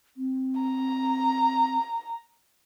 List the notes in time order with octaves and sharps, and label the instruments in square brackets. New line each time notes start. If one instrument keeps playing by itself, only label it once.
[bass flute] C4
[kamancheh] A#5